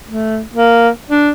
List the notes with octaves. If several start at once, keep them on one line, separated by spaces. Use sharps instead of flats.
A3
A#3
D4